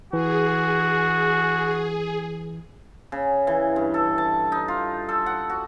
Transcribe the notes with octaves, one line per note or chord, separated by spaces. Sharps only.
E3 F#4 G#4
C#3
E3
G2
A4
A5
D#4
F4
A4
F#5
F#4